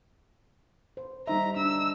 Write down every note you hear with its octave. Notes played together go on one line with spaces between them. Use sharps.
C5
G3 D#4 E5 A#5
D4 E6